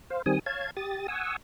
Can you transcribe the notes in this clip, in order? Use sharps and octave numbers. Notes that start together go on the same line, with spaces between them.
C5 F5
D#3 G3 C4 G#5 D#6
C#5 F5 A5 G#6
G4 D#6 A6
F#5 G#5 C#6 D#6 E6